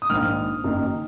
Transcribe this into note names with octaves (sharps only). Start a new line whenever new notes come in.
D#6
A#1 G#2 D#3 F6
F#1 F#2 D#3